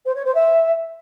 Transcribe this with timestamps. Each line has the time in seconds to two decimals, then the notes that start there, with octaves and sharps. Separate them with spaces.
0.05 C5
0.15 C#5
0.25 C5
0.34 E5